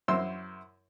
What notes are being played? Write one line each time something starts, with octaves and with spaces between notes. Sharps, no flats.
F#2 E4 C5 C6 E6